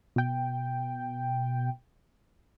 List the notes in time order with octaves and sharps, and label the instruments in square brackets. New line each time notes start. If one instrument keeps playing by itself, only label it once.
[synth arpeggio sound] B2 G5